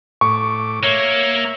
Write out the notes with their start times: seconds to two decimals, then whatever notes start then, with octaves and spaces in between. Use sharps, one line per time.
0.21 A2 C#6 D6
0.83 A#3 C#5 E5